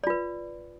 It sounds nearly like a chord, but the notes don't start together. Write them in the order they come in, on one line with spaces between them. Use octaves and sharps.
D5 F4 B4